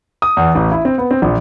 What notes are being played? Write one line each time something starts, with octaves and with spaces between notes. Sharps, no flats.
D#6
E2
A1
E4
C4
B3
C4
A#1